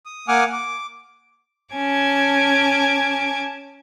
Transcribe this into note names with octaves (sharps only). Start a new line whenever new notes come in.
D#6
A#3 F#5 G#5 D6 D#6 F6
D6
C#4 G#5 A5 D6 G#6